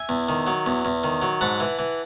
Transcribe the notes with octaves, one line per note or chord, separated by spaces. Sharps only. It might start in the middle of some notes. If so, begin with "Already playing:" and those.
Already playing: E5 G#5
E2
D#3
F#3
E2
E2
D#3
F#3
G#2 F#5 A5
E3
E3